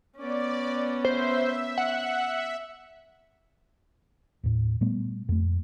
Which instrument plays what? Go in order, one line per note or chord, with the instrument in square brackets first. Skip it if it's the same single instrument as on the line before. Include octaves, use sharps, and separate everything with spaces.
[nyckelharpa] B3 C#4 [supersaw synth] D5
[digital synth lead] C5 [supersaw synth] E5
[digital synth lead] F#5
[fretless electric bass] D#2 A2
A#2 G3 A3 B3
F2 A3